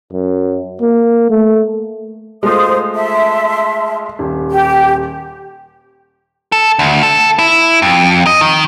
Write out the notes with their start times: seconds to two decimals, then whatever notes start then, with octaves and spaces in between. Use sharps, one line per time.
0.13 F#2
0.81 A#3
1.30 A3
2.43 G#3 A3 F4 C5 D#6
2.95 E5 A5 C6
4.19 D#1
4.49 G4
6.52 A4
6.79 D2
7.03 A4
7.39 E4
7.82 F2
8.26 D#5
8.41 D#3